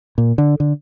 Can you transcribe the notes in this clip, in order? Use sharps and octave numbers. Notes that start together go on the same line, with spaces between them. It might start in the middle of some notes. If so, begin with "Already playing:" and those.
A#2
D3
D3